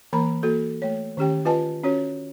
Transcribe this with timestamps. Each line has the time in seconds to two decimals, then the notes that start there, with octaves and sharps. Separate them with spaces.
0.13 E3 A#3 A#4 A#5 B5
0.43 A#3 F#4 A4
0.82 A3 C#5
1.17 D#3 C#4 G4 G5
1.45 F4 B4 D#5 G#5 A5
1.83 C#4 F#4 C#5